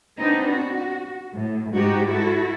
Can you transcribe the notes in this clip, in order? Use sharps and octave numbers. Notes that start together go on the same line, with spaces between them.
B3 C4 D4 D#4
F#4
A2
G#2 G3 D#4 F#4 G4
E4 F#4 A4